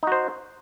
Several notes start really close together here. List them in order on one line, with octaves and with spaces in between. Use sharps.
D#4 F#4 C5